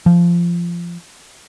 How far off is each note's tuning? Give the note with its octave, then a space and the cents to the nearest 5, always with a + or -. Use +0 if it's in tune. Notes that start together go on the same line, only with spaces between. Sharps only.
F3 -15